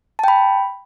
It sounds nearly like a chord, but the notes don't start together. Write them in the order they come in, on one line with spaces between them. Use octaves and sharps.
A5 G5 B5